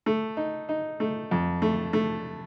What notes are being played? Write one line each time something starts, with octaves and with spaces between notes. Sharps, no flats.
A3
D#4
D#4
A3
F2
A3
A3